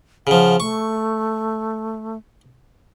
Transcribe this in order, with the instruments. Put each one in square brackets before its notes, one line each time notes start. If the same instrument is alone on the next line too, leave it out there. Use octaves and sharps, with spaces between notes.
[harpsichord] C#3 F3 [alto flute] F#5
[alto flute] A3 [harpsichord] C#6